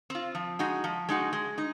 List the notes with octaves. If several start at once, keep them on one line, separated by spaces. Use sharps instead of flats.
C4 F4
F3
G#3 D#4 F#4
F3
G#3 D#4 F#4
G#3
D#4